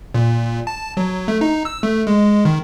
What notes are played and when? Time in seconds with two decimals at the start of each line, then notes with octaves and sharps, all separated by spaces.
0.14 A#2
0.67 A5
0.97 F#3
1.28 A3
1.41 D#4
1.65 E6
1.83 A3
2.07 G#3
2.45 D#3